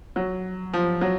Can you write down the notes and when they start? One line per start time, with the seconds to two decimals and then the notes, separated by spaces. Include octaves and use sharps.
0.16 F#3
0.73 F3
1.01 F#3